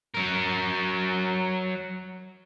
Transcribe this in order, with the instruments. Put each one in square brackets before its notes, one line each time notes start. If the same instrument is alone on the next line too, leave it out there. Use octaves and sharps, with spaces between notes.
[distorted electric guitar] F#3 A#4